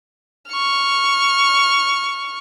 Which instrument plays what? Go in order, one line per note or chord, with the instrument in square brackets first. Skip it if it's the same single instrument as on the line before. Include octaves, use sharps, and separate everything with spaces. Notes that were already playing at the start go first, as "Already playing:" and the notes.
[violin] C#6 F6